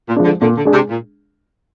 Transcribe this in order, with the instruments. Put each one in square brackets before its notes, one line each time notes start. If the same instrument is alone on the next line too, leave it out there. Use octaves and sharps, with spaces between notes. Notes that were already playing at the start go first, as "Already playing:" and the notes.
[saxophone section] A#2
[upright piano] F3 G#3 D4
[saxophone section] D3
[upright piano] A#2 [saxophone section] D3
[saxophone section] D3
[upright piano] G#3 D4 G#4
[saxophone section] C3
A#2